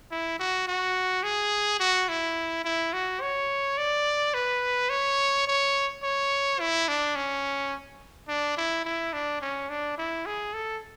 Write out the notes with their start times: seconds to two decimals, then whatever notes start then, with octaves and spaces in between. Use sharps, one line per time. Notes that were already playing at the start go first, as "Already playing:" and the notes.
0.11 E4
0.39 F#4
0.67 F#4
1.23 G#4
1.80 F#4
2.08 E4
2.64 E4
2.93 F#4
3.21 C#5
3.77 D5
4.34 B4
4.90 C#5
5.47 C#5
6.03 C#5
6.59 E4
6.88 D4
7.15 C#4
8.28 D4
8.57 E4
8.85 E4
9.13 D4
9.41 C#4
9.69 D4
9.98 E4
10.26 G#4
10.54 A4